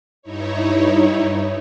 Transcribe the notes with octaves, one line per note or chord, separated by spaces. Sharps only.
G2 D#4 E4 C#5